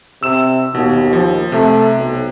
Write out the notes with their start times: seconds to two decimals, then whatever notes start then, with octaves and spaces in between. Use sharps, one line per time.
0.23 C3 E6 E7
0.75 D#2 B2
1.13 F3
1.52 C3 A3
1.97 B1